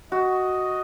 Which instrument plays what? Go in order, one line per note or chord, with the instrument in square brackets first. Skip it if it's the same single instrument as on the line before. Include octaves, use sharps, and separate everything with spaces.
[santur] F#4 [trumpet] D#5